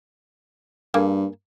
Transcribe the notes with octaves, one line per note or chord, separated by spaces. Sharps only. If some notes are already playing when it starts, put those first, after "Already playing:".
G2 A#3 G#4 A4